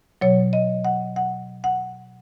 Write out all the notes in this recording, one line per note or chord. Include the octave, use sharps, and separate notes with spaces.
B2 F#3 C#5
D#5
F#5
F#5
F#5